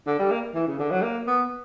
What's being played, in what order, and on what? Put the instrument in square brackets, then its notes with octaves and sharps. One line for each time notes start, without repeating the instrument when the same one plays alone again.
[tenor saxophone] D3
G3
A#3
E3
C#3
D3
F#3
A#3
B3